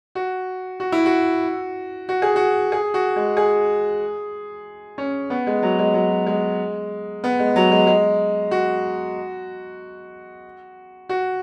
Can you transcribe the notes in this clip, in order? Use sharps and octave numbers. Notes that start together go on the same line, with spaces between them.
F#4
F#4
E4
F#4
F#4
G#4
F#4
G#4
F#4
G#3
G#4
C#4
B3
G#3
F#3
G#3
F#3
G#3
B3
G#3
F#3
G#3
G#3
F#4
F#4